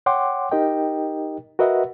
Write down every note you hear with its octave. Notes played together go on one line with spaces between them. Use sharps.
C#5 F#5 G5 C6 D6
D#4 G4 A#4 D#5 G5
F#4 A#4 B4 D#5 E5 F#5